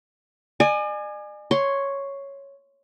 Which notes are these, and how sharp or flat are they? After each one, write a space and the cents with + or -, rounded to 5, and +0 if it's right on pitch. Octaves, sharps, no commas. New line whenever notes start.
D5 +45 G#5 +0
C#5 +0 C6 +0